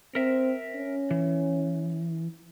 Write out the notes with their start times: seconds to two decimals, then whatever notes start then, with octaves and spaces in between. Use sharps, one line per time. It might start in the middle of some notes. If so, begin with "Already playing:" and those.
0.15 C4 A#4 E5
0.76 C#4
1.11 E3